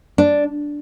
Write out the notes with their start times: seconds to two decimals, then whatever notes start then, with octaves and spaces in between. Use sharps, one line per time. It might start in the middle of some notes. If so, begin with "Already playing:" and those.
0.18 D4